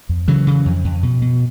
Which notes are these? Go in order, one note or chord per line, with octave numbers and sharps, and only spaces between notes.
F2
C#3 E3 F#3
C#3
F2
F2
B2
B2